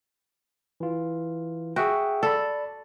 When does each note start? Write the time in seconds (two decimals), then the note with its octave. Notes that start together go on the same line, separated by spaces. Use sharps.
0.80 E3 F4
1.76 F#4 G#4 E5 G5
2.23 A4 D5 A5 B5